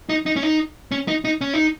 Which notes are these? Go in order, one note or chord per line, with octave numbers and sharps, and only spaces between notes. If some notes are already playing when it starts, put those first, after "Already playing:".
D#4
D#4
C#4
D#4
C#4
D#4
D#4
C#4
D#4